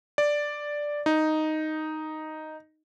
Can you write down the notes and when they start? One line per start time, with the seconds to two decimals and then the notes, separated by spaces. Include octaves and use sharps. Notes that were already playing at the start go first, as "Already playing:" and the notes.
0.18 D5
1.06 D#4